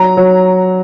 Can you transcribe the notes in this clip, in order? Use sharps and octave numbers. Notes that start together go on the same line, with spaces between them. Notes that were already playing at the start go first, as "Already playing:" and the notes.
Already playing: F#3 A#5
F#3